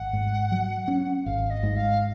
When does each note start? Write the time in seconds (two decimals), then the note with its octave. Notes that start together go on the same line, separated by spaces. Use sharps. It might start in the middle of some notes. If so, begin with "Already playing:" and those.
Already playing: G#1 F#5
0.13 G#2
0.52 F#3
0.88 C#4
1.25 G#1 F5
1.50 D#5
1.63 G#2
1.76 F5